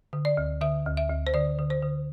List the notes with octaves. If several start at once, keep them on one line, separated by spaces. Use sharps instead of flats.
D3
D5
D2
D3 E5
D2
E5
D2
C5
D3 D5
D3
C5
D3